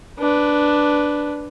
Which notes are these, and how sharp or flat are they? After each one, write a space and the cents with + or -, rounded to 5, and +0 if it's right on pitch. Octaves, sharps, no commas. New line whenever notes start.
D4 +0 B4 +0